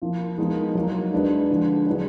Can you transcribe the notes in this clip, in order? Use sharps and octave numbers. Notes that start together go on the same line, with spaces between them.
F3 A#3 F4
F3 G#3 B3 D#4 A#4
F#3 A#3 D#4
G#3 D4 F#4 B4
D3 F3 G#3
F#3 D4 G#4 B4